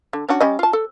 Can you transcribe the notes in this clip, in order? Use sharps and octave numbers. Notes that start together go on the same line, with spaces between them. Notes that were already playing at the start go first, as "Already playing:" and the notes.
D3
C#4 D4 F#4
G3 C#4 D#5
F4 A5
A4